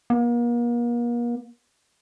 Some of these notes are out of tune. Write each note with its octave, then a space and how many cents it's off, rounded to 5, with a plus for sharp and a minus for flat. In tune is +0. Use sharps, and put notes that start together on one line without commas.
A#3 +40